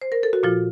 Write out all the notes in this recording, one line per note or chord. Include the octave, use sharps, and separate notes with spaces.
C5
A#4
A4
F#4
A#2 F3 F4